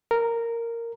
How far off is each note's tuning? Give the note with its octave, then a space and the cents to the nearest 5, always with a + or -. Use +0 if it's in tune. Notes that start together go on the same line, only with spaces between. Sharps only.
A#4 -10